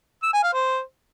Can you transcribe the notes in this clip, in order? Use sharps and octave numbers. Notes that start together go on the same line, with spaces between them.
E6
G#5
F5
C5